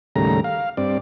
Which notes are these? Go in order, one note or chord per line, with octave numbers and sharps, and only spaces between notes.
D#2 A2 C#3 G3 A#5
F5
G2 C4 D5